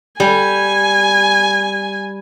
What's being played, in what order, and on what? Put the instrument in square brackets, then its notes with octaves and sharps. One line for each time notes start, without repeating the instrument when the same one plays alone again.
[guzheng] G3 [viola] G#5